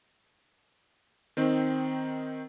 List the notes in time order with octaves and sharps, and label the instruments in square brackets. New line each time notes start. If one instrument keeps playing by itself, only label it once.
[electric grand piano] D#3 C4 D#4